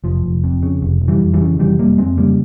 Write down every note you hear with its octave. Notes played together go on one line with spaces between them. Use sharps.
F1 F3
F1
F2
C#3
F1
F1
E3 G3
F2
E3 G3
C#3
F1 E3 G3
F1 G3 A#3
F2 G#3 C4
C#3 G3 A#3